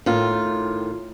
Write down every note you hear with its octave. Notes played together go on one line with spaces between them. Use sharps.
A2 D#3 F4